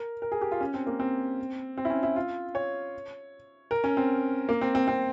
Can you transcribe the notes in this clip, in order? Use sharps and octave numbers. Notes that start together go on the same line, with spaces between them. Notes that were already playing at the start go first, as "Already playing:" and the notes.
Already playing: A#4
A#4
G#4
G4
F4
C#4
C4
A#3
C4
C4
E4
C#4
E4
F4
C#5
A#4
C#4
C4
A#3
C4
C4
C4